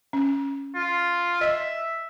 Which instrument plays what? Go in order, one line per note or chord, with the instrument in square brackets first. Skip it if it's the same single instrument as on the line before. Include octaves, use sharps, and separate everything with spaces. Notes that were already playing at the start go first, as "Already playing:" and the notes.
[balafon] C#4
[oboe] F4
[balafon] D#5 [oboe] E5